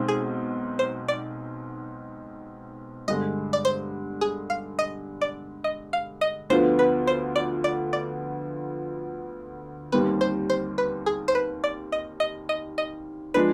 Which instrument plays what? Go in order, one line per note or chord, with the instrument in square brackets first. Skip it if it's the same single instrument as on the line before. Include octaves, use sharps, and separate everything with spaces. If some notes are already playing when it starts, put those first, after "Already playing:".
Already playing: [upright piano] B1 B2 G#3 C4 D#4
[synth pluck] G#4
C5
D5
[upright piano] G2 D3 G#3 [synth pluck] D#5
[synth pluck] D5
C5
G#4
F5
D#5
D5
D#5
F5
D#5
[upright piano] D2 D3 F3 B3 F4 [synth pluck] C5
[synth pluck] B4
C5
D5
D5
D5
[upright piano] D#2 D#3 G3 C4 [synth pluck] B4
[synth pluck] C5
C5
B4
G#4
C5
B4
D5
D#5
D#5
D#5
D#5
[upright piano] F3 G#3 D4 [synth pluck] B4